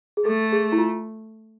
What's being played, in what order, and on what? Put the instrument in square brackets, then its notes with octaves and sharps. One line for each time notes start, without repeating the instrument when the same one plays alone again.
[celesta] G#4
[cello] A3 [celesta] A4
[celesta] G#4
E4
F4